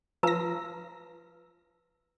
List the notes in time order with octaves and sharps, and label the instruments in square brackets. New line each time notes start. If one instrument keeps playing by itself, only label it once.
[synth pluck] F3 A#6 [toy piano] B4 A#5 E6